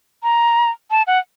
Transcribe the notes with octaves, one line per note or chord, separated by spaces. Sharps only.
A#5
A5
F#5